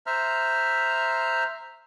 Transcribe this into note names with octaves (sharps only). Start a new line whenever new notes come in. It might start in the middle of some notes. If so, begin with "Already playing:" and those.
C5 E5 A#5 F6